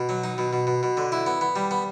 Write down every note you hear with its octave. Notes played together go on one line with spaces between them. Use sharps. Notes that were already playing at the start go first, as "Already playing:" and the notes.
Already playing: B2
F#3
D#4
B2
B2
B2
B2
D3
E4
B3
B3
G3
B3